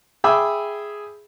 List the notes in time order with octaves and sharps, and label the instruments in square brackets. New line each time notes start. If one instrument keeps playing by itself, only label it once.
[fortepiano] G#4 E5 G5 B5 D6 E6